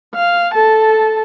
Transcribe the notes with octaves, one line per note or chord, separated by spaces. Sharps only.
F5
A4 A5